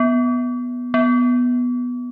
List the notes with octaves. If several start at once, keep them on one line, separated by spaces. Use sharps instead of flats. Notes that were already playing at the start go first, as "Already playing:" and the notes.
Already playing: B3
B3